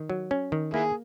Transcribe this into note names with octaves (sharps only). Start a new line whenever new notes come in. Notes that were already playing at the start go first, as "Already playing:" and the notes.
Already playing: D#3
F#3
C#4
D#3
A#3 E4 G#4